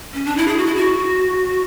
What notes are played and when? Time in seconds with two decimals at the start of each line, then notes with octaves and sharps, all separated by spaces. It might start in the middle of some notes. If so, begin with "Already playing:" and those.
0.14 C#4
0.25 D4
0.37 E4
0.48 G#4
0.57 F#4
0.66 E4
0.76 F#4